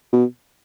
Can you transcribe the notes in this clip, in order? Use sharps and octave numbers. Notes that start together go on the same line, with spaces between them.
B2